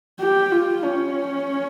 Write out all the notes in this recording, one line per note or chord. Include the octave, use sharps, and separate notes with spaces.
G4
F4
C#4